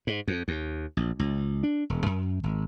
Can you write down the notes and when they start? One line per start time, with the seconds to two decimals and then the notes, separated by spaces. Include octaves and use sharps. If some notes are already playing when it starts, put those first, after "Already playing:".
0.07 G#2
0.28 F2
0.48 D#2
0.97 A#1
1.19 C#2
1.63 D4
1.90 E1
2.06 F#2
2.43 G#1